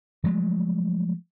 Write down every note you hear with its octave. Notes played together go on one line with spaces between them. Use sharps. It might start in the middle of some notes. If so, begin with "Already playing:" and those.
F3 F#3 G#3 A3